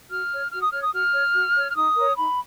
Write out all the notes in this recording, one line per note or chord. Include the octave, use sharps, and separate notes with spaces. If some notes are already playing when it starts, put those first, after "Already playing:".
F#4 F6
C#5
F#4 F6
D#6
C#5 F6
D#6
F#4 F6
C#5
F#4
C#5
F6
D#4 D#6
A#4 C#5
D#4 B5